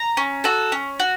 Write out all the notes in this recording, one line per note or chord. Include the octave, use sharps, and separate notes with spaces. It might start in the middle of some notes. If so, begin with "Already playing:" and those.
Already playing: A#5
C#4
F#4 A4
C#4
F#4